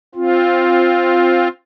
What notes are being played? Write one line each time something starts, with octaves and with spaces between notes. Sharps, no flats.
C4 F4